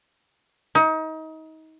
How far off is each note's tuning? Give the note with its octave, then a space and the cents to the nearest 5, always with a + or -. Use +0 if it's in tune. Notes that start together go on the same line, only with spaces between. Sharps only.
D#4 +30